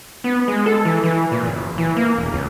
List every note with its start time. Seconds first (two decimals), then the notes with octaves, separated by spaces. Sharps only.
0.24 B3
0.48 G#3
0.66 A4
0.85 E3
1.04 E3
1.32 A#2
1.46 F#1
1.78 E3
1.97 A#3
2.18 E1
2.32 C#2